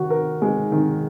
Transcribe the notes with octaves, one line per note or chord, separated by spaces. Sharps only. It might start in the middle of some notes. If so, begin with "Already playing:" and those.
Already playing: D#3 F#4
A#4
G#3
D#3